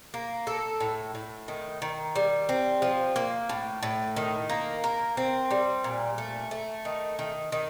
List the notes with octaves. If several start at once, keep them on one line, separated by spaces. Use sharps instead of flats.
A#3
A4
A2
A2
D#3
D#3
G3
C4
F3
A#3
A2
A2
D#3
A#3
A#4
C4
G3
A#2
A3
A3
D#3
D#3
D#3